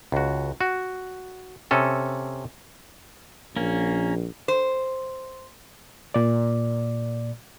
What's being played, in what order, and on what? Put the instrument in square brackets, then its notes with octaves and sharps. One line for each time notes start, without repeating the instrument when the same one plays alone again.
[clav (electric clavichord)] C#2 F#4
F#4
C3 C#4 A4
[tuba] A#1 [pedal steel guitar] A#3 C#4
[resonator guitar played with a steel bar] C5
[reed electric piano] A#2 D5